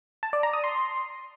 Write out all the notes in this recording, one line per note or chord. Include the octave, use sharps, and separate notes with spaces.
A5
D5
A#5
D#6
C6